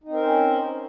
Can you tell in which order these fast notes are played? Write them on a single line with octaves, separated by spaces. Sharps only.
D#4 C4 A#4 C5 C#4